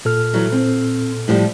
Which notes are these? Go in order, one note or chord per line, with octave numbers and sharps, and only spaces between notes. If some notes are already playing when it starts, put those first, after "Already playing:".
A#2 A4 F6
E3 F#3
C4
A2 F3 G3